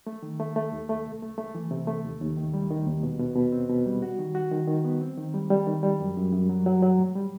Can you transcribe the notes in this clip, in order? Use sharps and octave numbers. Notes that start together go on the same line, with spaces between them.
A3
D#3
A3
A3
D#2
A3
C2
A3
A3
E3
C3
A3
D#2
D#2
D#3
G3
D#3
D#2
B2
B2
B2
C4
B2
G3
F#4
D#3
F#4
D#3
D#3
B3
C4
D#3
G3
G3
D#3
G3
F#2
F#2
F#2
F#3
F#3
F#3
A2
G3